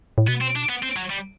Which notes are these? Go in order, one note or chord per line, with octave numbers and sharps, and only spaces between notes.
A2
B2 B3
C4
D4
B3
C4
F#3
G3